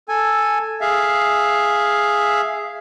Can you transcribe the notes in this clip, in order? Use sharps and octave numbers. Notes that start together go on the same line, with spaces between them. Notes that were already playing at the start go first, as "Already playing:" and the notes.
A4 G#5
G#4 E5 F5